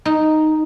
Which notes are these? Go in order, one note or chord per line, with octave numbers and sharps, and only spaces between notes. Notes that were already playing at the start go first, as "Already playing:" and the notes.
D#4